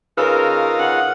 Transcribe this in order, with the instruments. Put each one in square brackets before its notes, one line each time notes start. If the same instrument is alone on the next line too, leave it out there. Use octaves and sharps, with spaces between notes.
[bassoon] C#3 [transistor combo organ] D#4 F4 [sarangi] A#4 [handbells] B4 E6
[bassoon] C#3 [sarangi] F#5